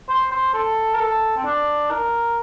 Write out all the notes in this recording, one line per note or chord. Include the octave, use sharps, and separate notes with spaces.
C5
C5
A4
A#4
A4
C4
D4
A#4